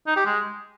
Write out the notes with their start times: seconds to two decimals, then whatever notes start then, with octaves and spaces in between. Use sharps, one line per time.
0.07 D#4
0.16 G4
0.26 G#3